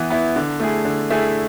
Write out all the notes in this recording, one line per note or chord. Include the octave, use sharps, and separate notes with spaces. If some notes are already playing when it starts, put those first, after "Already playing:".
Already playing: E3 B3 E4
B3 E4
D3
A3 E4 G#4
D3
A3 E4 G#4